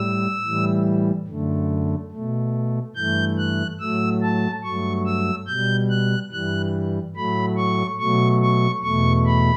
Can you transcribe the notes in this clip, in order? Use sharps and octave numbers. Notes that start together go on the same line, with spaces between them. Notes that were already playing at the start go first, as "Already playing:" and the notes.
Already playing: A2 G3 E6
A2 E3 G3
F#2 D3 A3
B2 A3
G2 E3 A3 G6
F#6
A2 F#3 A3 E6
A5
G2 F#3 A3 C#6
E6
B2 G3 G6
F#6
G2 E3 G3 F#6
A2 F#3 A3 B5
C#6
B2 F#3 A3 C#6
C#6
E2 B2 A3 C#6
B5